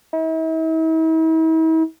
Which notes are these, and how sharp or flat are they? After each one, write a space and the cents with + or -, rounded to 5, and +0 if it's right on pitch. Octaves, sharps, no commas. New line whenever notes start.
E4 -45